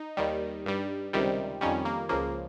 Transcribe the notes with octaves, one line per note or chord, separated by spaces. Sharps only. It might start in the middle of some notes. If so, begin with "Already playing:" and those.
Already playing: D#4
D#2 D#3 G3
G2 G3
C#2 C3 D#3 G3
F2 D#3 G3 C#4
A#3
C#2 C#3 F3 A#3